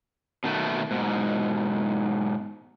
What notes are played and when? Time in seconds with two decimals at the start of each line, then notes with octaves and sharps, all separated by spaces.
0.44 B2 D#3 A3
0.91 G#2 B2